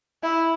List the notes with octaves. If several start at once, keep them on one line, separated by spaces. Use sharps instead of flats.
E4